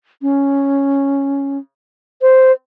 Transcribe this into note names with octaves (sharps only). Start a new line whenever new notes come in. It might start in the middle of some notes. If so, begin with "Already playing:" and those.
C#4
C5